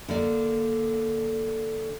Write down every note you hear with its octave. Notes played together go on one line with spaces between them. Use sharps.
D3 A#3 D5